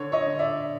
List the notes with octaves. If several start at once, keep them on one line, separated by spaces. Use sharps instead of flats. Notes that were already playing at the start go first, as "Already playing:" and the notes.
Already playing: D3 C#5
C#5 D#5
D3
D5 E5